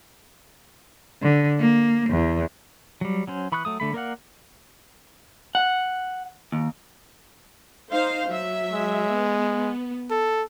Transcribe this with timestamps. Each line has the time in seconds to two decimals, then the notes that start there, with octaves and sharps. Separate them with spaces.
1.22 D3
1.59 A#3
2.10 E2
3.01 F#3 G3
3.27 F#3 C#4 C5
3.52 E3 B5 C#6 D#6 F#6
3.65 F#3 A3 D#6
3.80 D3 A3 B5
3.93 A#3 A#4 D5 F5 F#5
5.55 F#5
6.52 D#2
7.92 D#4 C5 F5
8.28 F#3 E5
8.74 G#3
9.11 B3
10.11 A4